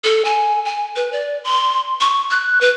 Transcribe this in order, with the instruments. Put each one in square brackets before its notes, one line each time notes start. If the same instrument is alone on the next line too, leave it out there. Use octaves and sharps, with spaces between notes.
[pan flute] A4
G#5
G#5
B4
D5
C6
C#6
F#6
B4